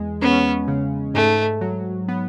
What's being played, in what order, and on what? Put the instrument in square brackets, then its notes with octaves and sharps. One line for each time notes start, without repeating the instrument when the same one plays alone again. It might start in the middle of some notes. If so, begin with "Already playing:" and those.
Already playing: [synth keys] E2 G#3
[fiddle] B3 [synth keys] C#4
[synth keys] C#3
[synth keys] G#2 [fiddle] A3
[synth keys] F#3
B3